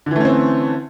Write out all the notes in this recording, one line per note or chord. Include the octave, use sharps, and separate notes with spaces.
D3 E3 A3 C4 C#4